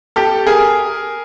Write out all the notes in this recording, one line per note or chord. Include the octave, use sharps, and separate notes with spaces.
G4 A4
G#4 A#4